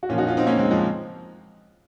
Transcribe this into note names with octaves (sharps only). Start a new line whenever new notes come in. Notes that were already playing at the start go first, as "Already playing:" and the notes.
F#4
A#2 F3 C#4 F4
D#4 F#4
C#4 F4
C4 D#4
A#3 C#4
G#3 C4
F3 G#3